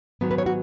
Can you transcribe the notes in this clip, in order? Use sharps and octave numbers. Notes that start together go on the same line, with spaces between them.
G#2 D#3 F#3 B3
B4
C#5
F#4